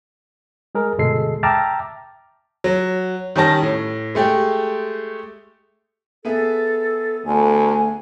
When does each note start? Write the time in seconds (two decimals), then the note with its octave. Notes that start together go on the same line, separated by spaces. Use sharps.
0.75 G#3 G#4 A#4
0.98 G1 B2 G#3 A4 C7
1.43 E5 G5 A5 A#5 D6 F6
2.64 F#3
3.36 D#3 G3 C#4 A5 A#6
3.62 A2
4.15 G#3 A3 G4
6.25 B3 G#4 A4 E5
7.26 D2 A3 G#5